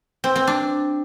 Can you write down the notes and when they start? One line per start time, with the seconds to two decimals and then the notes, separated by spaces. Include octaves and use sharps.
0.24 C4
0.36 C4
0.47 D4